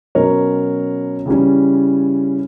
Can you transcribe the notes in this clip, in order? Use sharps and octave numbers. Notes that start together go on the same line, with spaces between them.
B2 F#3 C#4 A#4 C#5
C#3 E3 G3 C#4